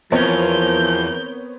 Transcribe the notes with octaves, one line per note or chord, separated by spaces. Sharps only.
E2 F3 B3 C4 A#4 C#5 G6